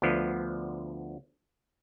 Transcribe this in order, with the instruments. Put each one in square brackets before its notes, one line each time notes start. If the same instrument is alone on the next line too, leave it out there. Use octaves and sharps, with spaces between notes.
[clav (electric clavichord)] D2 D3 F3 B3